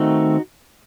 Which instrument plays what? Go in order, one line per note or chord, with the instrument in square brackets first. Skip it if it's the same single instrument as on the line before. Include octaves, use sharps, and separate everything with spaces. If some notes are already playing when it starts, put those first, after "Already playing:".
Already playing: [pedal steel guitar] D#3 A3 C4 D#4 F#4